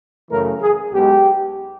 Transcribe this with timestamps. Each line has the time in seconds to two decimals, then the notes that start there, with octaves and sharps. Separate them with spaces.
0.30 F#2 C#3 E3 A3 A#4
0.61 G#4
0.92 B1 B2 G#3 G4